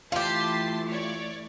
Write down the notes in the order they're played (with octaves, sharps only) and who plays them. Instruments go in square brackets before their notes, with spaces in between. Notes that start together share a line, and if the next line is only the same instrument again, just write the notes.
[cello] E3 A3 [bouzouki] F4 G4 [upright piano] F5 [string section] A5 C6 B6
[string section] C#5 D5